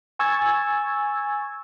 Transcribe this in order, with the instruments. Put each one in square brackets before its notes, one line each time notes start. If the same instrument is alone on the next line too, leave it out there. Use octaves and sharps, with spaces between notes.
[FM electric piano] G#5 C#6 E6 G#6 A6